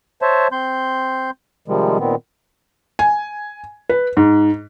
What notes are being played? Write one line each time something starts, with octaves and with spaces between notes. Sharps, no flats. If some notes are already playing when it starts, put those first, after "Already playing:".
C5 C#5 E5 A5
C4 C6 G6
C3 D#3 F3 G3 G#3
A#2 D#3 B3 C4
G#5
B4
G#2